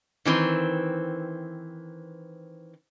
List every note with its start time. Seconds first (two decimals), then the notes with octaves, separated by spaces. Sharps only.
0.25 D#3 E3 C4